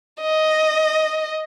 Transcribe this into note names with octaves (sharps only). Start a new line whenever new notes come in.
D#5